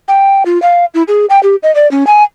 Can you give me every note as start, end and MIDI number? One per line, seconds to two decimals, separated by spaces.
0.08 0.43 79
0.45 0.61 65
0.62 0.85 77
0.94 1.03 64
1.08 1.26 68
1.30 1.41 79
1.43 1.55 67
1.63 1.73 75
1.75 1.89 74
1.91 2.06 61
2.07 2.23 80